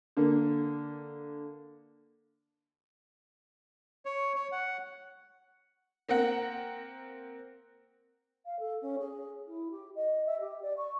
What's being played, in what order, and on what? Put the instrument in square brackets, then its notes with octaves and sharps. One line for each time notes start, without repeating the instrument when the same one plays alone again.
[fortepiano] D3 A#3
[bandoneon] C#5
C#5
F#5
[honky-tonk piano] A#3 C4 A#4 F#5
[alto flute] F5
A4
C#4
G#4
E4
G4
D#5
E5
G4
D5
C#6